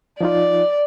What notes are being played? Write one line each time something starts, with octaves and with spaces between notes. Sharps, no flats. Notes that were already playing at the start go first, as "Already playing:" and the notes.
F3 D#4 F4 D5